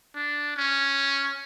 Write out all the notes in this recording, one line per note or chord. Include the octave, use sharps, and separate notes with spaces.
D4
C#4